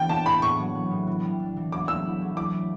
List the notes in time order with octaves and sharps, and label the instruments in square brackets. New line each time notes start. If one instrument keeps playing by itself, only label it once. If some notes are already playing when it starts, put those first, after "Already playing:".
Already playing: [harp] E3 D4 [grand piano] G5
[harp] B3 [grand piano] A5
[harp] A2 [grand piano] B5
[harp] A2 [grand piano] C#6
[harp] F#3
B3
A2
E3
G3
D4
E3
[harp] F#3 [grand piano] D6
[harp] A3 [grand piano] E6
[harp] E4
F#3
[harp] E4 [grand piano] D6
[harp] A3